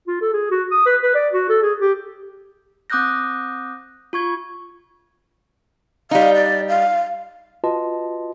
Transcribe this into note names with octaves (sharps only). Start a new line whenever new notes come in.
F4
A4
G#4
F#4
D#6
B4
B4
D5
F#4
A4
G#4
G4
C4 D6 D#6 F#6 G6 A#6
F4 C#6 G#6
G3 D#4 F5
D5
F5
F4 F#4 B4 D#5 A5 C6